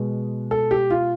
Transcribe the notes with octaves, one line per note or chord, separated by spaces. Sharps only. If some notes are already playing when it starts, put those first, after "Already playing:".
Already playing: B2 G#3
A4
G4
F4